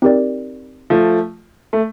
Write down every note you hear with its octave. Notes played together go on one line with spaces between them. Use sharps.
C4 D#4 G4 A#4 D5
F3 A3
A3